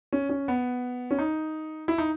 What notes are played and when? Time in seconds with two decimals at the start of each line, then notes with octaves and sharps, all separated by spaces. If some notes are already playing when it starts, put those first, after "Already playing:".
0.13 C#4
0.29 C#4
0.48 B3
1.11 C#4
1.19 D#4
1.88 E4
1.98 D#4